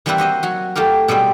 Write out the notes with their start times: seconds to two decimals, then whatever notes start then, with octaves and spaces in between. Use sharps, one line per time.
0.06 E3 G3 A#3 C4 E4 B4
0.18 F#4 C5 D#5 E5
0.43 F#3 F#4
0.75 A3 F4 G4 A#4
1.08 B2 G3 G#3 C4